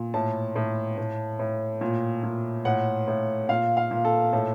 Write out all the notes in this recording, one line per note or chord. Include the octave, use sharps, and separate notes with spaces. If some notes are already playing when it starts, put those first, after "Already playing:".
Already playing: A#2
A2 A5
A2
A2
A2
A#2
A#2
A2 F#5
A2
A#2 F5
F5
A#2
A4
A2 A4